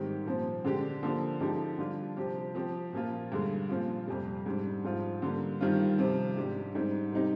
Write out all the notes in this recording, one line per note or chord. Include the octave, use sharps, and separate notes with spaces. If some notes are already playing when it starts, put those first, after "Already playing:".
Already playing: G#2 D#3 G3 C4 G4
A#2 F3 C4
D3 G#3 D4 G4
D3 F3 A#3 D4
D3 F3 G#3 D#4 G4
D3 G3 D4 F4
C3 F3 C4 G4
F3 C4 G4
A#2 F3 A#3 F4
G2 D3 G#3
A#2 F3 C4 F4
F2 C3 G3
G#2 G3 D4
G#2 F3 C4 F4
D3 G3 A#3
G2 D#3 G3 C4 F4
C3 F3 C4
G#2 G3 D4 G4
G#2 G3 C4 D#4
C3 G3 C4 D#4 G4